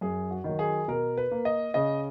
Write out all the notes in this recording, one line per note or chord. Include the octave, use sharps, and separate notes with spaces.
F#2 G#4
F#4
D#3
F#3
G#4
B2 A#4
B4
A#3
D#5
C#3 D#5